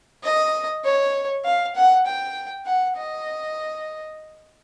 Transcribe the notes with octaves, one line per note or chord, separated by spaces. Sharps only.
D#5
C#5
F5
F#5
G5
F#5
D#5